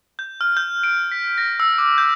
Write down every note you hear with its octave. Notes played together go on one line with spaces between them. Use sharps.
G6
F6
G6
D7
B6
A#6
E6
D6
G6